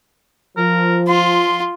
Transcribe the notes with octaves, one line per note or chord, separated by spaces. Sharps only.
F3 A#4
F4 C6